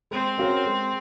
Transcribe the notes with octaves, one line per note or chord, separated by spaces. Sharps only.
G#3 C4
C#4 F#4 A#4
G#3